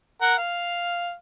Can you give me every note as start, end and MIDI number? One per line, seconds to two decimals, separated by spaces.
0.22 0.34 70
0.22 0.34 78
0.38 1.14 77